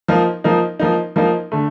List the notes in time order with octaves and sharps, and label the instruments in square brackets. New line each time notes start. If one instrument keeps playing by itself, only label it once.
[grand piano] F3 A#3 D#4
F3 A#3 D#4
F3 A#3 D#4
F3 A#3 D#4
D3 A3